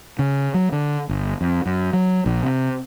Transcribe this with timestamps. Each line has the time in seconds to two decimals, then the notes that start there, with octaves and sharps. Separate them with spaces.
0.19 C#3
0.54 F#3
0.72 D3
1.09 G1
1.41 F2
1.66 F#2
1.93 F#3
2.26 A#1
2.43 C3